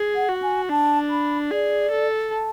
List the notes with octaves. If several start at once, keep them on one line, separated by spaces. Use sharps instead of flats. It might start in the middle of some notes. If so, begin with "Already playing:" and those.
Already playing: G#4
F#5
F#4
G#5
D4 A5
B5
G#4 D5
A4
A5